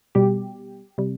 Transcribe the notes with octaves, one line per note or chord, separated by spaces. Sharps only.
B2 G3 G4
C3 G3